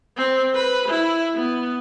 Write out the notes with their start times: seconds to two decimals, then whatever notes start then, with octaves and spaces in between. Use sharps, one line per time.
0.17 C4
0.55 B4
0.88 E4
1.35 B3